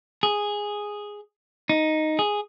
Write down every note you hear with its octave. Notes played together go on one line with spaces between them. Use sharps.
G#4
D#4
G#4